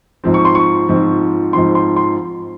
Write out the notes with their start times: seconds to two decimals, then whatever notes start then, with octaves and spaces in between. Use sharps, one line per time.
0.24 G#2 F3 C4
0.34 C#6
0.45 C6
0.55 C#6
0.89 G#2 F3 C4
1.53 G#2 F3 C4 C6
1.75 C6
1.96 C6